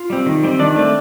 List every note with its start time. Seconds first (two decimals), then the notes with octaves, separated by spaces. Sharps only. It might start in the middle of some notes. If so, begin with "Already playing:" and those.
Already playing: F4
0.10 G3 C4
0.26 D#3
0.43 G3 C4
0.59 D#3 D4 D5
0.76 A3 C4